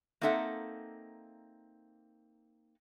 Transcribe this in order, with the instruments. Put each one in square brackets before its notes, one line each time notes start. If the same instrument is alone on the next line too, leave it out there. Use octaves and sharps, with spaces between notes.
[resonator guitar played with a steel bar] A#3 C4 D#4 A4 E5 F#5